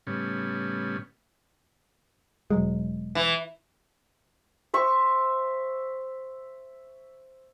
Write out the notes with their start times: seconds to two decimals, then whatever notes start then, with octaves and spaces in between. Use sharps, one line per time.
0.07 A2 C#3 G3 B3 C#4
2.50 E1 F#3 G#3
3.15 E3
4.74 C5 E5 C#6